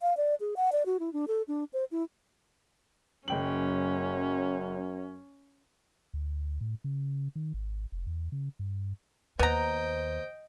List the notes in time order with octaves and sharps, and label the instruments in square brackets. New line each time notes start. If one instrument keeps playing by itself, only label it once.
[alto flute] F5
D5
G#4
F#5
D5
F#4
E4
D4
A4
D4
C5
E4
[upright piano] F#1 G5 F#7 [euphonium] F#2 [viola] C#4
[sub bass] D2
A2
C#3
D#3
G#1
F1
E2
C#3
G2
[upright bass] D#2 [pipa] B3 A#5 [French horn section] C5 [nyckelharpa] D#5 G5